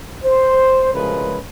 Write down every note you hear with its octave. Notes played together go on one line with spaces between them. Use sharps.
C5
C2 C#3 F3 G#3 A#4 B4